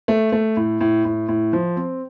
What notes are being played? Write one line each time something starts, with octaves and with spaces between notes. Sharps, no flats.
A3
A3
A2
A2
A2
A2
F3
C4